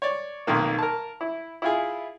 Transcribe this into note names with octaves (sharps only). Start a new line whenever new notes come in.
C#5 D5
B1 F2 D#3 A#3
A#4 A5
E4
E4 F4 G#4